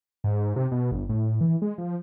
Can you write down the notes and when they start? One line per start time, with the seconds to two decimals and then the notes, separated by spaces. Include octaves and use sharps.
0.24 G#2
0.56 C3
0.71 B2
0.92 G1
1.09 A2
1.41 E3
1.62 G#3
1.78 F3